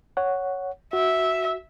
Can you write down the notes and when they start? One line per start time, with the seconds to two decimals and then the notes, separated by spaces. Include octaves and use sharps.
0.17 C#5 F#5
0.93 F#4 E5